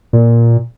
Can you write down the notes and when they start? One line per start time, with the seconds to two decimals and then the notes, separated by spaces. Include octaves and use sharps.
0.13 A#2